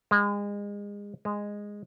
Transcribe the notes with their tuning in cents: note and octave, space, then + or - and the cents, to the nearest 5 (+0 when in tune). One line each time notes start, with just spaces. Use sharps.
G#3 -30
G#3 -10